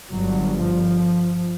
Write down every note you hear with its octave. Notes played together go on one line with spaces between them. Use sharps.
G1 G2 F#3
F3